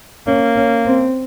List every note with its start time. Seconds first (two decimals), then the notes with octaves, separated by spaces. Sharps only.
0.27 A#3 C#4
0.56 C#4
0.86 C4